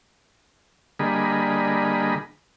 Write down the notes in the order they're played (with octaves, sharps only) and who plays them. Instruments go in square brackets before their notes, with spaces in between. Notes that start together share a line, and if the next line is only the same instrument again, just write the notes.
[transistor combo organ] D3 G3 A#3 G#4 D#5 B5